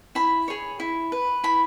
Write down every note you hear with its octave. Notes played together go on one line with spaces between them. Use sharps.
E4 B5
G#4 C#5
E4
B4
E4 B5